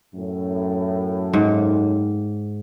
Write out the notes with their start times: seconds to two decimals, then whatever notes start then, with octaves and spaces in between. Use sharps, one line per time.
0.15 F#2 A2
1.33 G#2